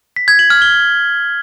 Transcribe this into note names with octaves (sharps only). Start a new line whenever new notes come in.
B6
G#6
F#7
F6
G7